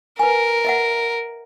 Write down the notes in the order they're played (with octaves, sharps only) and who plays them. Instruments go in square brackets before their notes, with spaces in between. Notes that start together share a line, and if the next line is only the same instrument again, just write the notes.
[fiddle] A#4 [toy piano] B4 G#5
[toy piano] D#5 E5 F#5